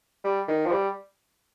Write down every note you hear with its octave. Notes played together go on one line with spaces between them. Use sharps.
G3
D#3
F3
G3